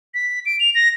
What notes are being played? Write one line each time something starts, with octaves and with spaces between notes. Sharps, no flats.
B6
D7
F7
A#6